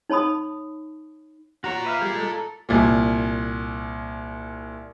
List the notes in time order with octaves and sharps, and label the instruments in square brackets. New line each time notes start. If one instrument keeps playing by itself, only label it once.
[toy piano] D#4 C#5 A5 B5 D#6
[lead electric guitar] F4 A#5 [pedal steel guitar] F#4 C#5
[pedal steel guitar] B4 E5 F5
G3 G4 G#4
G#3 A4
A4
[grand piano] C2 A#2